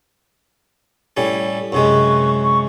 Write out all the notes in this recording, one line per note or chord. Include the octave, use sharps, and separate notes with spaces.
A2 G3 C#4
F#2 C3 G#3 B4 C#6
C#6